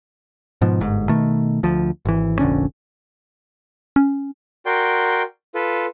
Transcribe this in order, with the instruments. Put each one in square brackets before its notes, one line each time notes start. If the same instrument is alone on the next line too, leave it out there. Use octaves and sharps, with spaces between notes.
[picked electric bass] G#2 B2 F3
G1 G#2
B2 D#3 A3
D2 F3
G#1 E3
F1 A#1 D3 C#4
[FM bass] C#4
[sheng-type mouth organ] F#4 A#4 D5 G5 C6
F4 A4 B4